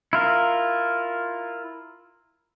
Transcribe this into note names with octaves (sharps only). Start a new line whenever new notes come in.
E4 F4 A#4